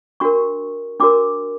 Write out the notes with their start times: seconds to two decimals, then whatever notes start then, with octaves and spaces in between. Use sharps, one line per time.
0.20 D4 F#4 A#4 C#6
1.00 D4 F#4 A#4 D6